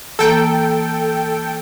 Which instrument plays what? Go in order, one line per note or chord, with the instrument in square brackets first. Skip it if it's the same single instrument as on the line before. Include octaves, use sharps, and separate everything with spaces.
[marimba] E3 A#3 [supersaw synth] A4 G5